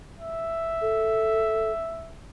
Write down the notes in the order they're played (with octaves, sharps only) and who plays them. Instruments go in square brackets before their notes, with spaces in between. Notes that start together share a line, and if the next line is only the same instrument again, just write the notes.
[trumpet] E5
[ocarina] A4